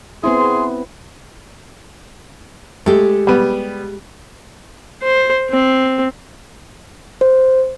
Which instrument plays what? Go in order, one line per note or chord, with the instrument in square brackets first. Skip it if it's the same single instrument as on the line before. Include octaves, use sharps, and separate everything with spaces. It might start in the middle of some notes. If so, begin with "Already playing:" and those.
[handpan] B3 C4 E4 [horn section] G#4 C6
[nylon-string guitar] G#3 G4 [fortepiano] A3
[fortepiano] G3 B3
[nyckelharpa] C5
C4
[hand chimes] C5